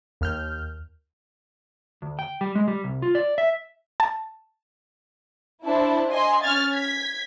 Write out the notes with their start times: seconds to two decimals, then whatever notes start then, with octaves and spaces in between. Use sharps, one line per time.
0.21 D#2 F6 G6
2.02 D2
2.19 G5
2.41 G3
2.55 G#3
2.68 G3
2.84 C2
3.02 F4
3.15 D5
3.38 E5
4.00 A5
5.64 D4 E4 C5 A5
6.11 D#5 G#5 C6
6.42 C#4 F6 G#6 A6
6.72 G#6 B6